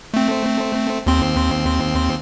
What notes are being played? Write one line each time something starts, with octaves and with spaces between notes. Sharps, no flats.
A3 C4
D#2 C4 C6